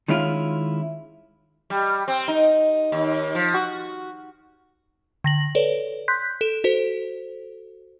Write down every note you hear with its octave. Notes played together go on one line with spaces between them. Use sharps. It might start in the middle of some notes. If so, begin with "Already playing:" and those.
D#3 G#3 C#4 E4 F4
G3
C4
D#4
D#2
F3
F#4
D3 A#6 F#7
A4 B4 C#5 D5
C6 F#6 G6 B6
A4 E7
F#4 A4 C5